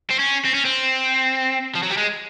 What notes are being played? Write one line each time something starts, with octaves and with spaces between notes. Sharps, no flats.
C4
C#4
C4
C#4
C4
F3
F#3
G3
G#3